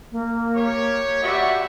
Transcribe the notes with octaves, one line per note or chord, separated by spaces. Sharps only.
A#3
G4 C#5
F#4 G4 D5 E5 B5 C#6